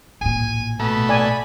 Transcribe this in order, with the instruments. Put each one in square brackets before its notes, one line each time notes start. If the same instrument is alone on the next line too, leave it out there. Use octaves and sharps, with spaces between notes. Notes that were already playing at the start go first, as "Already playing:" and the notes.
[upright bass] A1 A#2 [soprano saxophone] G#5
[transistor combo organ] B2 A3 A5 [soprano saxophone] B5
[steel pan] D5 G#5